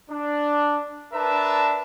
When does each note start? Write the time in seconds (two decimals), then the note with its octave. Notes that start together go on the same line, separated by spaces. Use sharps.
0.10 D4
1.14 D4 A#4 B4 E5 A5